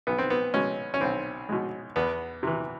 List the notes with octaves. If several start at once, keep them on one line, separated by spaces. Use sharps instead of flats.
B1 B3
C4
B3
B2 G#3 C#4
C#4
B1 C4
B2 G#3
E2 B3
C3 E3